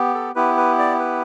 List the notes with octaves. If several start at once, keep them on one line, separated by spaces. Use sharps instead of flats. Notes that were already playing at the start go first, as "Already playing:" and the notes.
Already playing: B3 G4
A4
B3 E4 G4 B4
B4
D5
B4